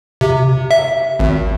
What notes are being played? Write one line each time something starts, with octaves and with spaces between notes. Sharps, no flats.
C3
E5
G#1